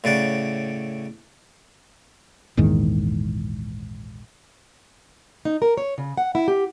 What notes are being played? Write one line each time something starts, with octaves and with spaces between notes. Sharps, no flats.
A2 C#3 D5 F#5
A#1 E2 G#2 D#3
D#4
A#4
C#5
C#3
F#5
E4
G4